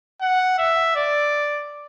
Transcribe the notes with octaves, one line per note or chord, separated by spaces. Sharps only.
F#5
E5
D5